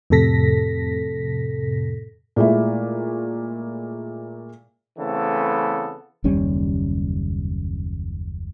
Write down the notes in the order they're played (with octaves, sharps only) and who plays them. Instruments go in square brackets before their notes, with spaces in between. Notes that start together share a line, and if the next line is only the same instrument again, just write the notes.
[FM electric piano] F2 A2 C3 A4 A#6 B6
[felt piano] A#2 G#3 A3 E4
[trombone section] C#3 E3 A3 B3 C4 A4
[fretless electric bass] F#1 D#2 G3 C#4